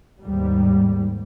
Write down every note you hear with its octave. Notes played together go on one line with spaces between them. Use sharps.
D#2 G#2 G3